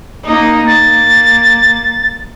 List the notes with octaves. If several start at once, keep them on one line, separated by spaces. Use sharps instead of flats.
A#3 D#4
A#3 A6